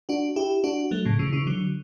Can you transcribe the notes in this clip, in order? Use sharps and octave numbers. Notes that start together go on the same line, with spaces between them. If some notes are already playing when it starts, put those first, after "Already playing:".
D4 F#4
E4 G4
D4 F#4
F#3 A3
A2 C#3
C#3 E3
C#3 E3
D3 F#3